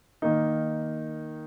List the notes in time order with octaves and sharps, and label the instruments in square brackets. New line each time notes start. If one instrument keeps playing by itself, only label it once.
[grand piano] D#3 A#3 D#4